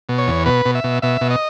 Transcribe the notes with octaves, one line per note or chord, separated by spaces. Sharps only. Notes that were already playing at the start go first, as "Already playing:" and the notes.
B2
C#5
E2
B2 B4
B2
E5
B2
B2 E5
B2
D#5